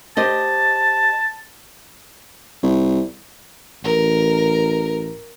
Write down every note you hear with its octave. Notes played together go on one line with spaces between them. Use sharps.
G4 C5 D#5 A5
C2
A1 A#4